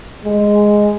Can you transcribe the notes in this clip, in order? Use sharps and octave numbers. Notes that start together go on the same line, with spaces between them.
G#3